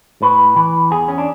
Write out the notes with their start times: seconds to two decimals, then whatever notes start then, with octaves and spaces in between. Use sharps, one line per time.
0.22 A2 B4
0.56 E3
0.91 E2 G#4
1.08 C#4
1.18 D4